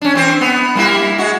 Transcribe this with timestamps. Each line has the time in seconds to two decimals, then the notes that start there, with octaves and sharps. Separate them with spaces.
0.02 C#4 D4
0.14 E3 C4 C5
0.41 B3
0.75 G3 A#3 E4
1.18 G#3 F#4